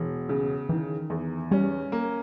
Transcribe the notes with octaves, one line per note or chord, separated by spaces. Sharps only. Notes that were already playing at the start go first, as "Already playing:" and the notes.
Already playing: E1 E3
C#3
D#3 E3
E2
G3 C#4
A#3